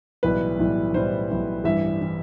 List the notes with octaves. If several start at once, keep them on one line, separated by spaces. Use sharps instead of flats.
B1 A2 E3 G3 B4
B1 A2 E3 G3
B1 A2 E3 G3 C5
B1 A2 E3 G3
A1 G2 E3 G3 E5
E3 G3